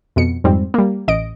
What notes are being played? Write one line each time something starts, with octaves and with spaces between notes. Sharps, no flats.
F2 B2 C#7
F2 G#2 G3 C4
G3 A#3
A1 D#5 D7